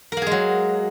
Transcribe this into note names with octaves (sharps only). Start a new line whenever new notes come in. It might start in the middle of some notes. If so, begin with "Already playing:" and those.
F#3 G#3 A#3 G#4 A#4